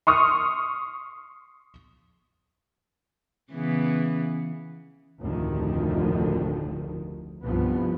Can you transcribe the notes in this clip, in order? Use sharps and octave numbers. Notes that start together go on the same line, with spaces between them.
C6 C#6 D#6 F6
C#3 E3 B3
F1 D2 A2 D3 D#3 F3
C2 G2 F3 B3